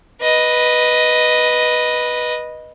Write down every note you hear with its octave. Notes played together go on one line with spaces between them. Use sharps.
B4 D#5